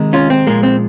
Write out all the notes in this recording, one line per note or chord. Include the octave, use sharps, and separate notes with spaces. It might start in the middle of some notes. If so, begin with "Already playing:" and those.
Already playing: C3 D#3 G#3
C#4 F4
C4
A#2 F3 G#3 A#3
C4